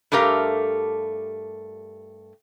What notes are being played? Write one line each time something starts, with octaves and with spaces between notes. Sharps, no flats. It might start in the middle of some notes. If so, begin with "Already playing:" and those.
G2 A3 G4 A#4 F5